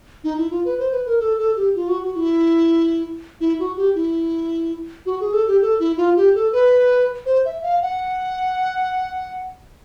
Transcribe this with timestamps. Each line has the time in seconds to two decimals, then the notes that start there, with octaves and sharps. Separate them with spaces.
0.24 D#4
0.37 E4
0.51 F4
0.65 B4
0.79 C5
0.92 B4
1.06 A#4
1.20 A4
1.38 A4
1.56 G4
1.75 F4
1.88 F#4
2.03 F#4
2.16 E4
3.40 E4
3.59 F#4
3.77 G4
3.95 E4
5.06 F#4
5.20 G#4
5.33 A4
5.47 G4
5.62 A4
5.80 E4
5.97 F4
6.16 G4
6.35 A4
6.53 B4
7.26 C5
7.45 E5
7.63 F5
7.82 F#5